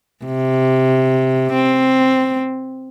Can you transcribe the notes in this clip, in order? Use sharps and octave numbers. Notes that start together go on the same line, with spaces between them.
C3
C4